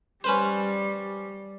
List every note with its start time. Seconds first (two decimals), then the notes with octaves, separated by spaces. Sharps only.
0.24 G3 C#4 B4 C5